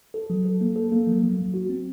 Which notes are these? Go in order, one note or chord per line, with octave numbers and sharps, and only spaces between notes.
A4
F#3
A4
A#3
A4
A#3
F#3
F#3
F#3
F#4
C4